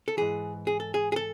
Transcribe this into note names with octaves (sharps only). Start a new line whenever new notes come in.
A4
G#2 E3 G#4
G#4
A4
G#4
G#4
A4